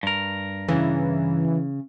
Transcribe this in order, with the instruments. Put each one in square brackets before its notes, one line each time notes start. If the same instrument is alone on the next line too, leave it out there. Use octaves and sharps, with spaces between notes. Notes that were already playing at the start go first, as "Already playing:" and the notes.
[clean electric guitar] G2 A#4
[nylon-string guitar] C#3 [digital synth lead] E3